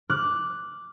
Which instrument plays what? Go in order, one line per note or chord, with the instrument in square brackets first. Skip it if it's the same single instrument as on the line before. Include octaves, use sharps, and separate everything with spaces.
[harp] D6 F6 F#6